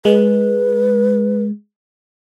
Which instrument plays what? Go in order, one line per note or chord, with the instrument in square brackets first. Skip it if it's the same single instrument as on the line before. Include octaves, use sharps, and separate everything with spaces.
[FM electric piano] G#3 [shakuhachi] B4